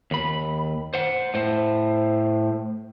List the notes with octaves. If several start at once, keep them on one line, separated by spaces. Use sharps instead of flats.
D#2 B5
C5 F#5
A2 C5